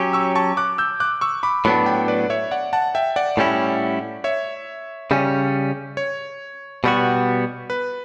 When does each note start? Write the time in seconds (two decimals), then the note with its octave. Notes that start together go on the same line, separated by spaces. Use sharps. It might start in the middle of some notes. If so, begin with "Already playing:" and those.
Already playing: F#3 C#4 G4
0.13 C#6 E6
0.35 A5 C#6
0.57 D6 F#6
0.78 E6 G6
1.00 D6 F#6
1.21 C#6 E6
1.43 B5 D6
1.65 A2 F#3 B3 D4 B5 D6
1.86 G5 B5
2.08 B4 D5
2.30 C#5 E5
2.51 D5 F#5
2.73 F#5 A5
2.95 E5 G5
3.16 D5 F#5
3.37 A2 G3 C#4 E4
4.24 C#5 E5
5.11 C#3 G3 C#4
5.97 C#5
6.84 B2 G3 B3 F#4
7.70 B4